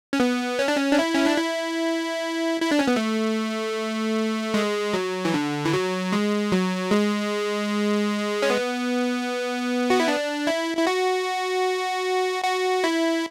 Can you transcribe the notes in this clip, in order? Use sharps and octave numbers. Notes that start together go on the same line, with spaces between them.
C#4
B3
C#4
D4
C#4
D4
E4
C#4
D4
E4
E4
D4
C#4
B3
A3
G#3
F#3
E3
D3
E3
F#3
G#3
F#3
G#3
C#4
B3
F#4
E4
D4
E4
E4
F#4
F#4
E4